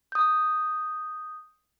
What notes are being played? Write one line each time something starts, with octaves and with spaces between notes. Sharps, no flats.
D#6 G6